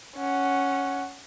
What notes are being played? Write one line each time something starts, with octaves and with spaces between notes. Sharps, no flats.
C#4 F#5